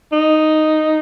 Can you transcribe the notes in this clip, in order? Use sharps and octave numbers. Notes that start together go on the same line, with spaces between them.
D#4